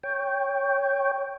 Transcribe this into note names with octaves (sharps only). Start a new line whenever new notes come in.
C#5 G5